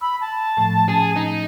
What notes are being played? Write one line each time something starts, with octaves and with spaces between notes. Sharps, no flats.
B5 E6
A5
A2 F3 A3
C#4 G#4
D#4